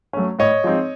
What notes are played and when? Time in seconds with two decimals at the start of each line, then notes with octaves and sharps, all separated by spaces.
0.13 F#3 A3 C#4
0.39 A2 C#5 D#5
0.64 F3 G#3 C4 D#4